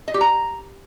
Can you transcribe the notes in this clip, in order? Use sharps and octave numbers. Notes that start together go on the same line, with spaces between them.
D#5
G4
A#5